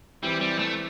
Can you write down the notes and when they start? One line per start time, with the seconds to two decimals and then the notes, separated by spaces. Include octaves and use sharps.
0.23 E3 G3 C4 E4
0.41 G3
0.59 A3